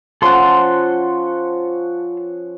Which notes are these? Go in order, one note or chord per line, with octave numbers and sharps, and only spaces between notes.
F3 C#4 A4 F#5 C6